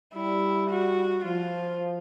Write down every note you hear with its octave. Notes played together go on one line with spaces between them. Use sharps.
G3 E4
F#4
F3 F4